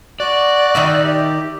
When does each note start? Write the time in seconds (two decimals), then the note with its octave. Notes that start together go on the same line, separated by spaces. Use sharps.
0.20 F#4 D5 D6 F#6
0.75 D#3 D#4 E5
1.04 G4